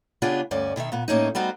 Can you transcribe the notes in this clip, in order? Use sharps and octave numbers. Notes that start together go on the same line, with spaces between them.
C#3 B3 D4 F4 G4 G#4
D2 G2 C#4 D5
B2 D#3 D#4 E5
A#2 B3
A2 A#3 C#4 D#4
G3 B3 D#4 F#4 C5